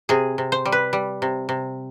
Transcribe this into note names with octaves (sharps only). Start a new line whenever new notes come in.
C3 G#4
C3
C5
G3
B4
G3
C3
C3